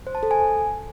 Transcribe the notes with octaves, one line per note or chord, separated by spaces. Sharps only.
C5
A5
A4
G#5